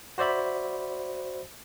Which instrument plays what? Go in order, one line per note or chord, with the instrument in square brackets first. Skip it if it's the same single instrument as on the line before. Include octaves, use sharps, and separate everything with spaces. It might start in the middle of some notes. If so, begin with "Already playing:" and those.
[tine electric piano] F#4 C5 D5 E5 B5